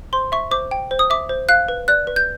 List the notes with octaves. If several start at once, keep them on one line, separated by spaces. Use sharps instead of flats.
C5 C6
E5 C#6
C5 D6
G5
C5
D#6
E5 D6
C5
F5 F#6
B4
D5 F#6
B4
G6